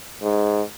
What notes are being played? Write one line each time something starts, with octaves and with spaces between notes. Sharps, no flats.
G#2